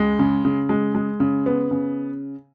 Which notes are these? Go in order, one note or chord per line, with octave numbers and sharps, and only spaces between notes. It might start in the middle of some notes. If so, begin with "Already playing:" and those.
Already playing: C#2 G#3
C#3
C#3
G#3
G#3
C#3
B3
C#3